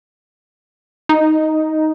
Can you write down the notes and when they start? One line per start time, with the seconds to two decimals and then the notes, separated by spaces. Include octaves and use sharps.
1.09 D#4